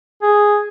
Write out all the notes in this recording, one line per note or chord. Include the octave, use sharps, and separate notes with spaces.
G#4